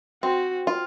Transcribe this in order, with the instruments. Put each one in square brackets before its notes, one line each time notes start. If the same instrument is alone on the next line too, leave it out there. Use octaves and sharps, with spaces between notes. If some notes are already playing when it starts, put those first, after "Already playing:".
[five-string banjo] C4 [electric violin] F#4
[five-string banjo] F4